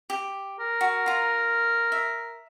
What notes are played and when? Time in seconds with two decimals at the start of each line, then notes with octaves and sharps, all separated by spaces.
0.10 G4
0.60 A#4
0.81 F#4
1.06 F4 A#5
1.92 E5